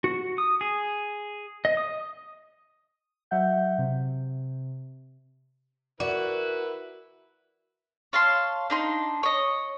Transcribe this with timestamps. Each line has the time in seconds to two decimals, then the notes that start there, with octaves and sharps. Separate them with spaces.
0.04 F#4
0.38 D#6
0.61 G#4
1.65 D#5
1.77 D#6
3.31 F#3 E5 F#5 G6
3.78 C3
6.00 E4 F#4 A#4 B4 D5
8.13 C#5 F5 A5 C6
8.70 D4 D#4 C6
9.23 C#5 D#5